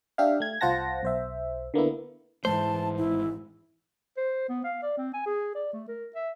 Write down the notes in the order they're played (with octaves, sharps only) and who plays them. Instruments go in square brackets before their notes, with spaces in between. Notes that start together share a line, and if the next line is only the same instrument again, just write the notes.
[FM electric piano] D4 G4 E5 F5
A3 G#6
C2 F4 C5 F#5 A5 A#6
B1 C5 E5
D3 A#3 B3 E4
[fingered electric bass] G#2 G#3 A3 [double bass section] E3 [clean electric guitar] C5 [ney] A5
[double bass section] G#1 [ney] E4
[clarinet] C5
B3
F5
D5
C4
G#5
G#4
D5
A3
A#4
E5